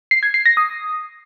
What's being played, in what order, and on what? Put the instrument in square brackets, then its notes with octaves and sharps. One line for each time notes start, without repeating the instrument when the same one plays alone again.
[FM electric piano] C7
G#6
C7
A#6
D#6